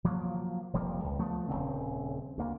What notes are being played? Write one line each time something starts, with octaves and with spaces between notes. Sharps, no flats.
F3 F#3 A#3
F1 F3 G3 A#3
C#2
F3 A3 B3
D#1 D#2 C#3 C4
D2 A#3